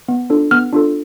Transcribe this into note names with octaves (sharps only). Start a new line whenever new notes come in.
B3
D4 F4 A4
B3 F6
D4 F4 A4